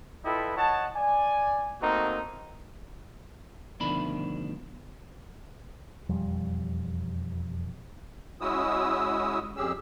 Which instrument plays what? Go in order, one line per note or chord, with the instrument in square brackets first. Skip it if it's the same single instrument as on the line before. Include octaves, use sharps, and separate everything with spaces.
[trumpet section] E4 F4 A4 B4 D#5 G5
C#5 D#5 F#5 A5
D5 G#5
A3 A#3 C4 D#4 F#4 A#4
[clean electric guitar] D2 B2 D#3 F3 D4 B5
[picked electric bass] E1 F2 G3
[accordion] G#3 C#4 E4 F#4 D#6 E6
F2 C#4 G4 G#4 E6